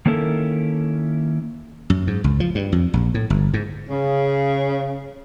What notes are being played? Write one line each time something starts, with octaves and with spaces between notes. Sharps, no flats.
D#3 A#3 C#4 E4 A4 A#4
F#2
G#2
C#2
F3
G2
F2
A#1
A2
G1
G#2
C#3